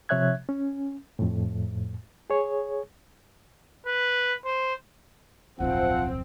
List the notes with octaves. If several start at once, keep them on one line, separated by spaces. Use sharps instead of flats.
C3 F3 C#5 E5 F#6 G#6
C#4
F2 A2
G#4 C#5
B4
C5
D1 B1 F2 F3 C4 F#5